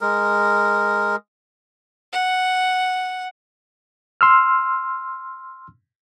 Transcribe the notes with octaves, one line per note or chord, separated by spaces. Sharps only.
G#3 A#4
F#5
C6 E6 F6